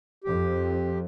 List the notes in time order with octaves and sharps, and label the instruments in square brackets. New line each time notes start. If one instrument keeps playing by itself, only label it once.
[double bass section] F2 [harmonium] G4